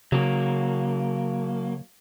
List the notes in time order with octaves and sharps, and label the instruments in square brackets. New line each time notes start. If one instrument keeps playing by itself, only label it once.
[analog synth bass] C#3 [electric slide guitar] F#3 A#3